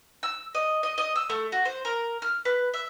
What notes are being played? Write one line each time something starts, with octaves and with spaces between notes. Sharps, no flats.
E6
D#5
D#5
D#5
E6
A3
F#4
C5
A#4
F6
B4
E5